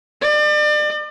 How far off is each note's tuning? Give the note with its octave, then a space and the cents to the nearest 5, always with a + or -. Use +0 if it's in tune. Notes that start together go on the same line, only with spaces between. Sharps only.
D5 +35